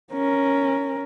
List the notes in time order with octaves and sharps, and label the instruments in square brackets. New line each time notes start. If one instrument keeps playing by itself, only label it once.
[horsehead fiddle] C#4 A#4